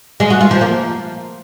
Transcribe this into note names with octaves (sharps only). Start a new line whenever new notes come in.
G#3
F#4
F4
F3
A#3